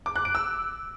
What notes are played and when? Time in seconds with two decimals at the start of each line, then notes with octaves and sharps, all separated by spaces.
0.06 D6
0.16 F#6
0.25 D7
0.35 E6